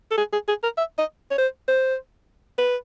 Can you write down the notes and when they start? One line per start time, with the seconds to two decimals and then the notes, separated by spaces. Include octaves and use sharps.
0.11 A4
0.18 G#4
0.33 G#4
0.48 G#4
0.63 A#4
0.78 E5
0.99 D#5
1.31 C#5
1.38 C5
1.68 C5
2.58 B4